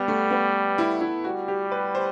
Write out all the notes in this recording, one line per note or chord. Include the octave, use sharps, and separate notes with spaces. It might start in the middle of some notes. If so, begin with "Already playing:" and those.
Already playing: G3 B3
A3
B3
E4
E4
G3 F#4
G4
B4
C5